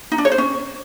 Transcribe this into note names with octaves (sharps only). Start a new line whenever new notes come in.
D#4
D4
C#5
C5
C#4